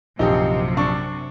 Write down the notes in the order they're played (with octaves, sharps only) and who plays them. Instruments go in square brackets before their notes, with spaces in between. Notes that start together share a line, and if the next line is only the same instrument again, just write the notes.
[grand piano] A#1 [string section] F#2 C3 [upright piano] D#4 G4
[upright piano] D4 C#6